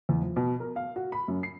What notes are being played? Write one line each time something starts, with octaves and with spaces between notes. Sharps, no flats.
E2
F3
B2
A#4
F5
F#4
B5
F#2
C7